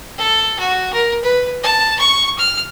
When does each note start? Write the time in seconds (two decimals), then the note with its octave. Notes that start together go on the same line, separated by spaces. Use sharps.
0.18 A4
0.60 F#4
0.93 A#4
1.24 B4
1.64 A5
2.00 C#6
2.39 F6